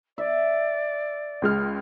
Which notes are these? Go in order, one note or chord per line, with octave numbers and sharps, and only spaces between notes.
D5 E5
C#2 G#3 F6